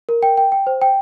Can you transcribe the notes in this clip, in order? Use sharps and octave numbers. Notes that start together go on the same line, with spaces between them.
A#4
G5
G5
G5
C5
G5